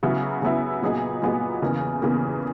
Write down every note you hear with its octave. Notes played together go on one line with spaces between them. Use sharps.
C#3 F#3 B3 E4
C#3 F#3 B3 E4
A#2 F#3 B3 D#4 G#4
A#2 F#3 B3 D#4 G#4
E2 C#3 E3 A#3
E2 C#3 E3 A#3